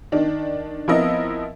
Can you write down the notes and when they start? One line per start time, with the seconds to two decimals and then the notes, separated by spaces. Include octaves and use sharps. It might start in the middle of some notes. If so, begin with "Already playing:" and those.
0.12 D#3 D4
0.88 F3 B3 C4 E4 A#4 D#5